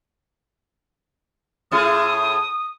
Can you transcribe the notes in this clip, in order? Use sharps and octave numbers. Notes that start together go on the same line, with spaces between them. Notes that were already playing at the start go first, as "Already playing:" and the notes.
A2 E4 G#4 D#6